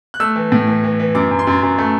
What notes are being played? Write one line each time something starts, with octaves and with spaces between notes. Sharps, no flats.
F#6
A3 E6
E3
A2
E3
E3
E3
F#2 D6
F#2
C6
F#2
F#2
A3